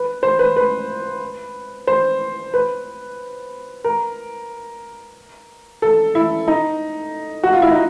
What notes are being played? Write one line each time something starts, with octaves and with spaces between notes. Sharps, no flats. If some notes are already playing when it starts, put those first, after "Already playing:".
Already playing: B4
C5
B4
B4
C5
B4
A#4
A4
E4
D#4
F#4
F4
E4
D#4